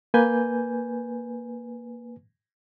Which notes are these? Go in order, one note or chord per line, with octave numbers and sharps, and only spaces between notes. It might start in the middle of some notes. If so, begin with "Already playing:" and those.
A#3 B4 G#5 G6